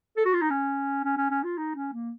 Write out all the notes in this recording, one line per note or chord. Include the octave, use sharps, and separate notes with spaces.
A4
F#4
F4
D#4
C#4
C#4
C#4
C#4
F4
D#4
C#4
A#3